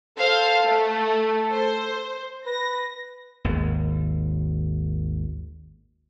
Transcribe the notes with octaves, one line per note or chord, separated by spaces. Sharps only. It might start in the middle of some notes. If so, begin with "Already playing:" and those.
A4 C5 F5
A3
C5
B4 A#6
G#1 D#2